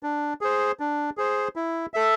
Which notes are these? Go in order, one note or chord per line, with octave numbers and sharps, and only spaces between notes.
D4
G#4 C5
D4
G#4 C5
E4
A4 E5